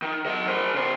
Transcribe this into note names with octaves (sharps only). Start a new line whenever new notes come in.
D#3
F#3 D#5
A#4 C5
C#3 C5